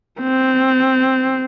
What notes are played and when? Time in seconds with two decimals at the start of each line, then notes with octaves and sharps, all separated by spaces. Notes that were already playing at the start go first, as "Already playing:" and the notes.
0.21 C4